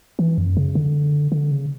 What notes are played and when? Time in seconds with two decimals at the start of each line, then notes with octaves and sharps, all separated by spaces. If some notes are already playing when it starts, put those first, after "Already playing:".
0.19 E3
0.38 F#2
0.57 C#3
0.75 D3
1.32 D3
1.51 C#3